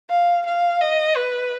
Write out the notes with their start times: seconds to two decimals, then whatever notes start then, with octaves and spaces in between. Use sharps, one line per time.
0.10 F5
0.46 F5
0.81 D#5
1.17 B4